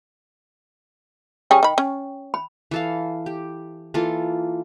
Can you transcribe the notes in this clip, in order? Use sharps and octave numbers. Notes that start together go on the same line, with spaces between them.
G3 C#4 G#4 G5
D#3 B5
C#4
B5
E3 A4 F5
G4
E3 A#3 F4 A4